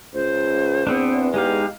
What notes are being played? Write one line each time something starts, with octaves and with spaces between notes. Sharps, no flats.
C#2 C5
E2 B3 C4 D4
G#3 D#4 G4 F5